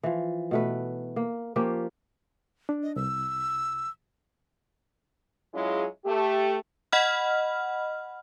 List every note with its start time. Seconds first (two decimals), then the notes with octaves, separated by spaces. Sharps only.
0.03 E3 F3
0.51 B2 A3 B4
1.16 A#3
1.56 F3 A#3 C#4 G4
2.69 D4
2.83 D#5
2.96 C2 E6
5.54 F#3 G#3 C#4 E4 F4 G#4
6.06 A3 G4
6.92 D#5 F#5 B5 F6